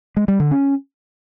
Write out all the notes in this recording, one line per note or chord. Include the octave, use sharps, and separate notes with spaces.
G#3
G3
D3
C#4